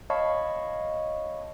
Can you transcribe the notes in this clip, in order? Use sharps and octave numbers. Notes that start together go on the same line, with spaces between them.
C#5 D#5 F5 A5 B5 C#6